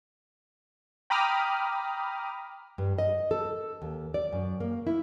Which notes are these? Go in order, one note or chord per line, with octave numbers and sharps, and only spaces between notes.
G5 A#5 B5 D6 D#6 F6
G2
D#5
A4
D#2
D5
F#2
A#3
E4